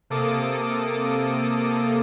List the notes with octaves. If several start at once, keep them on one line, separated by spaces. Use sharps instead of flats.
C3 A#3 A4 D6 D#6